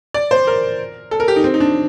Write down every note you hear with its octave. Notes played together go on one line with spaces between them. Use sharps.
D5
C5
A#4
A4
A#4
G4
D#4
C4
D#4
D4